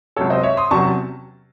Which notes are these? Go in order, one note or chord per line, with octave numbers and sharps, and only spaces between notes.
C#2 C3 F#3 C#4 A4 C#5
C5 D#5
C#5 E5
C6 D#6
E2 C3 F#3 C#4 A5 C#6